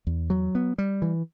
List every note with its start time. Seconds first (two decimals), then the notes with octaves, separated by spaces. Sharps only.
0.07 E2
0.30 F#3
0.55 B3
0.78 G3
1.02 E3